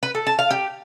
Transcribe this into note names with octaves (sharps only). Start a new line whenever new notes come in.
B4
A4
A5
F5
G4